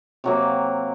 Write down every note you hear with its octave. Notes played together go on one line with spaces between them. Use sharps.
C3 F#3 A#3